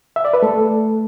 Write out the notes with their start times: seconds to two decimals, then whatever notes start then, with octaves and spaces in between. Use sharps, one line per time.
0.16 E5
0.25 D5
0.33 B4
0.43 A3 A4